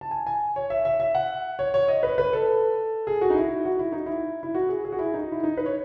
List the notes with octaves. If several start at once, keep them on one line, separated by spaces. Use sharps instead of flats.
A5
G#5
G#5
C#5
E5
E5
E5
F#5
C#5
C#5
D#5
B4
B4
A4
G#4
F#4
D#4
E4
F#4
E4
D#4
E4
E4
F#4
G#4
G#4
F#4
E4
D#4
E4
D#4
B4
C#5